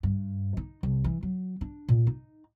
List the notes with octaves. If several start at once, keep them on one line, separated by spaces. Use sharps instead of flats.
G2
D#4
C2
E3
F#3
D4
A#2
D#4